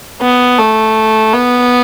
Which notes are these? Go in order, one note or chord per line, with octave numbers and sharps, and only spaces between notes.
B3
A3
B3